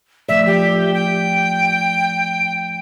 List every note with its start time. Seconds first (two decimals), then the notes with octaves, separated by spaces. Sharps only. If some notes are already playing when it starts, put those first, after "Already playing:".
0.29 F3 A3 D5 E5
0.46 G4
0.94 G5